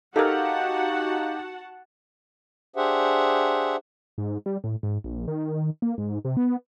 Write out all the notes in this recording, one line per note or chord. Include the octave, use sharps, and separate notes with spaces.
D#4 F#4 G4 A4 A#4 F5 F#5 A5
D4 G4 G#4 C5 E5 F#5
G#2
G3
A2
G#2
A#1
D#3
A#3
G#2
C3
B3